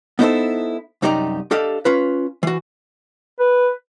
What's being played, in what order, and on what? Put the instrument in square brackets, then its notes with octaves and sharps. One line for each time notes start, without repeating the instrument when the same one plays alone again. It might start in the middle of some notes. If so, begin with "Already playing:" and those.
[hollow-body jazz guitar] B3 D#4 E4 G4 A4 C5
C2 F#2 D#4 G4 D5 A#5
D4 G4 A4 D#5 F5
C#4 F4 B4
E3 F#4
[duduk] B4